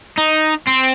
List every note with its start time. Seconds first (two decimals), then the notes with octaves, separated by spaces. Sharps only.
0.18 D#4
0.68 C4